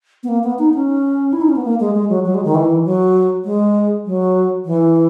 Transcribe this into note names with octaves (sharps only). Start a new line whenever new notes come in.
B3
A#3
B3
D#4
C#4
E4
D#4
C#4
B3
A#3
G#3
G#3
F#3
F#3
G#3
D#3
E3
F#3
G#3
F#3
E3